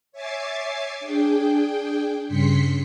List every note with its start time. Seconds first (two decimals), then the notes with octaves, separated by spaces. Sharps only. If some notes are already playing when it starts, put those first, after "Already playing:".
0.12 C#5 E5 G#5 D6 A6 C7
1.00 D4 G#4 G5
2.27 G2 C#3 C6 B6 C#7